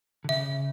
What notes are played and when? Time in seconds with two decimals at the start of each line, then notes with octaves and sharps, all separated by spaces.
0.24 D3
0.29 C#3 E5